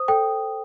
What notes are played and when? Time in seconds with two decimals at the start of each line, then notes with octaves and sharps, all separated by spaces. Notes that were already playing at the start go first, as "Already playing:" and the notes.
Already playing: C5 D#6
0.08 A4 G5